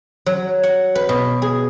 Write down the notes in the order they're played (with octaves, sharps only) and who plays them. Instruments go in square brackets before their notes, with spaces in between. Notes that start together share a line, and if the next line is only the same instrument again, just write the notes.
[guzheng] F#3
F#5
B4
B2
G#4